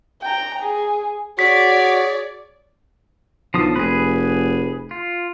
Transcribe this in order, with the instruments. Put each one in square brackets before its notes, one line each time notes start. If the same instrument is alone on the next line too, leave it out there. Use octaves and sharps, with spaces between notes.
[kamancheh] G5 A#5
G#4
[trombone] F#4 [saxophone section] G#4 C#5 [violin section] D5 [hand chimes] B6
[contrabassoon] B1 [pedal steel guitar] F3 D4 D#6
[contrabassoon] F1 [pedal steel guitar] G#4 B4
[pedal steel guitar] F4